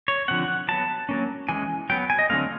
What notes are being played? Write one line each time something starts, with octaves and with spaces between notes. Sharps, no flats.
C#5
D3 F3 A3 C4 F#5
F#3 B3 A5
F#3 A#3 C#4
E3 G#3 C#4 G#5
F#3 B3 G5
G#5
D#5
D3 F#3 A3 C4 F5